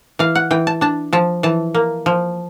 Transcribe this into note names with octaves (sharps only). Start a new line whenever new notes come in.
E3 F5
F#5
E3 G5
A5
D4 A5
F3 A5
E3 A5
A#3
F3